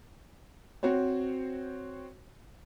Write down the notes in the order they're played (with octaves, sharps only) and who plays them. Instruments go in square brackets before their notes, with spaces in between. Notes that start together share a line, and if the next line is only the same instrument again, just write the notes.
[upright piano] C4 F#4 C5 C#5